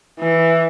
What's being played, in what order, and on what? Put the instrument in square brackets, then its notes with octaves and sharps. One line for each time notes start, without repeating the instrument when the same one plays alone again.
[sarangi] E3